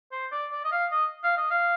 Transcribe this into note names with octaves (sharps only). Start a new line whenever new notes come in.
C5
D5
D5
D#5
F5
D#5
F5
D#5
F5